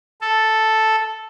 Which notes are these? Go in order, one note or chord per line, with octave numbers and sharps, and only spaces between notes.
A4